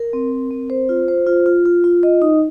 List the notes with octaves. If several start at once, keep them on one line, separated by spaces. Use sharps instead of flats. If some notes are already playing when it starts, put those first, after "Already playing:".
Already playing: A#4
C4
A#4
C4
C5
F4
C5
F4
F4
F4
F4
D#5
D#4